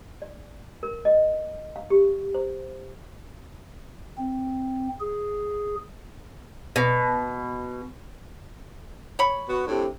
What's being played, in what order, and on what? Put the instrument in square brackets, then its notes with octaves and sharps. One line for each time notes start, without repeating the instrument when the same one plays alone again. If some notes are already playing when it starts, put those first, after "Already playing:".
[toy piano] D5
A#4
D#5
F5
G4
C5
[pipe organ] C4
G#4
[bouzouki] B2
[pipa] C#5 B5
[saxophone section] B3 F#4
A2 C3 D4